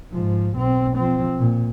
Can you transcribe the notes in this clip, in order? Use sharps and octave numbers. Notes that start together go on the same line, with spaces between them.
G#2 F3
B1 C4
F3 C4
A#2